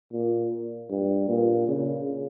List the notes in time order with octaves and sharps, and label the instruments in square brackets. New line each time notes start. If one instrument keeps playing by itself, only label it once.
[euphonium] A#2
G2
A#2
C#3